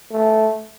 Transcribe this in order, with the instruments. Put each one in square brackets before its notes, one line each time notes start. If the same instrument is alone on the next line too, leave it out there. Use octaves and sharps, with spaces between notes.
[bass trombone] A3